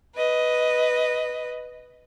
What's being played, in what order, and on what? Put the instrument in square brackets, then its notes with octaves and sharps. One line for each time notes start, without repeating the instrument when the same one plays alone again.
[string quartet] B4 D#5